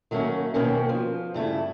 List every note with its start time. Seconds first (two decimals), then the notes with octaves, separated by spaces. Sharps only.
0.11 D#3 F#3 A3 A#3 C#4
0.54 B2 D#3 A#3 C4 C#4
0.89 F3
1.34 G2 C#3 A3 E4